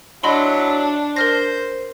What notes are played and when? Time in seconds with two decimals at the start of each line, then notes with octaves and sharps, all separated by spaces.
0.24 F#3 D4 E4 D#5 B5 C6
1.16 A#4 C5 F6 A#6